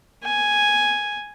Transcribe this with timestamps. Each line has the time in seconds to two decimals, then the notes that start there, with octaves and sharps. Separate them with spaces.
0.24 G#5